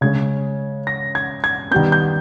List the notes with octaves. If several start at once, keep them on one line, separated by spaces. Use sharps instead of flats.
C#3 G#3 C#4 G#6
A#6
G#6
G#6
D#3 G3 B3 G6
G6